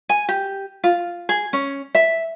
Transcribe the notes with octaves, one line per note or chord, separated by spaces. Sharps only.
G#5
G4
F4
G#4
C#4
E5